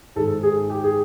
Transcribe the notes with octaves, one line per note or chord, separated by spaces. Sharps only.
G#2 D#3 G#3 A4
G#4
G4
G#4